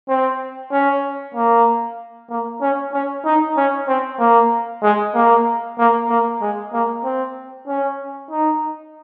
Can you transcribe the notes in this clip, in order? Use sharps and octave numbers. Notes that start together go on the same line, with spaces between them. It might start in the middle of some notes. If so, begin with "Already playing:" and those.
C4
C#4
A#3
A#3
C#4
C#4
D#4
C#4
C4
A#3
G#3
A#3
A#3
A#3
G#3
A#3
C4
C#4
D#4